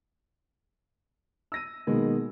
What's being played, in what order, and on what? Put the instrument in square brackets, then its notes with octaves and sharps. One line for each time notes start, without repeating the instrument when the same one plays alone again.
[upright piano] E6 A#6 D#7
B2 D#3 G#3 A#3 B3